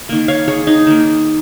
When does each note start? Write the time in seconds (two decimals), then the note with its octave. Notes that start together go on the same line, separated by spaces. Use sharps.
0.09 D#3 A#3
0.28 C#5 F5
0.48 G#4 C#5
0.67 D#4
0.87 D#3 A#3